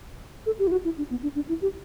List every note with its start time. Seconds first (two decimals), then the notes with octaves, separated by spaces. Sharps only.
0.46 A4
0.59 G4
0.67 E4
0.71 F#4
0.84 E4
0.98 D4
1.10 B3
1.23 D4
1.35 D4
1.48 E4
1.62 G4